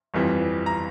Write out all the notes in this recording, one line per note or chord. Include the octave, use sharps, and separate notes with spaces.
G1 F2 E3 G3
A#5